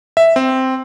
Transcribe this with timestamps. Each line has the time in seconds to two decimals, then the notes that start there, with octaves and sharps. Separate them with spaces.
0.17 E5
0.36 C4